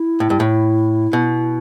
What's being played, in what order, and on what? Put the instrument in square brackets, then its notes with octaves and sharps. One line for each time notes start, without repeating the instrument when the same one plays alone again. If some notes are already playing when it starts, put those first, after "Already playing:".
Already playing: [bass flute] E4
[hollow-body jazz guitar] A2
G2
A2
B2